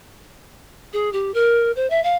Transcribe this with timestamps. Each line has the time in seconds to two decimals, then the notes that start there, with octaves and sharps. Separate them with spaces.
0.93 G#4
1.12 G4
1.34 A#4
1.75 C5
1.90 E5
2.03 F5